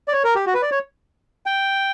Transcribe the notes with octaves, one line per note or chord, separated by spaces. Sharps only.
D5
C#5
A#4
G4
F#4
B4
D5
C#5
G5